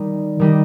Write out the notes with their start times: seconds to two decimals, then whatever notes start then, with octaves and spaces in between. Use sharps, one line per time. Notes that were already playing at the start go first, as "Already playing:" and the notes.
Already playing: D#3 G3 D#4
0.40 D#3 G3 D#4